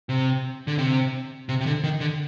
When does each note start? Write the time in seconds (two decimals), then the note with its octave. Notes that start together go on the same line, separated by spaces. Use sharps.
0.09 C3
0.67 D3
0.79 C3
1.49 C3
1.61 C3
1.66 D3
1.84 D#3
2.00 D3